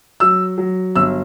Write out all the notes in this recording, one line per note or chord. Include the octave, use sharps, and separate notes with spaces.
F#3 E6
F#3
G1 E6